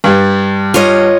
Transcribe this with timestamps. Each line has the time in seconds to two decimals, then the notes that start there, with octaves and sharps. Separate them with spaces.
0.04 G2 G3
0.74 F4 C#5 D#5